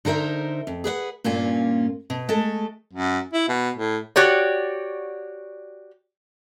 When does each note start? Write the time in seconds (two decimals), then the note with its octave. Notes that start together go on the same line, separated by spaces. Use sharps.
0.05 D3 D#4 A#4 C5 E5
0.67 F2
0.84 G#4 B4 D5 F#5
1.24 G2 A#2 A#3 C#4 F4 G#5
2.10 B2
2.29 G#3 A3 A4
2.93 F#2
3.33 E4
3.48 B2
3.77 A2
4.16 F#4 G4 C#5 D5